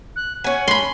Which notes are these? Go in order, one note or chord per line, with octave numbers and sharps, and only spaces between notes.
F#6
C#4 F#5 G#5
B5 C6 G7